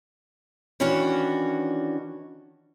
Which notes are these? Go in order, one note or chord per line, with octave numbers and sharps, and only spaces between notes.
D#3 E3 C#4 D4 F#4